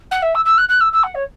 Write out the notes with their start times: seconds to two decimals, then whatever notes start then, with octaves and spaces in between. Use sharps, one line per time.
0.11 F#5
0.22 E5
0.35 E6
0.45 E6
0.58 F#6
0.69 F#6
0.81 E6
0.93 E6
1.03 F#5
1.15 C#5